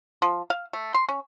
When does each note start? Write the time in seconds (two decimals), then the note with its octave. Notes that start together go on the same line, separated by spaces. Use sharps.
0.22 F3
0.50 F5
0.73 A3
0.94 C6
1.09 C#4